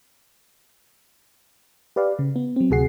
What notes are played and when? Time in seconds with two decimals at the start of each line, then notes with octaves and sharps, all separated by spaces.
1.96 G4 B4 D5 F5
2.19 C#3
2.36 B3
2.56 F#3 C4
2.70 D2 C3 F#4 G#4 F#5 C7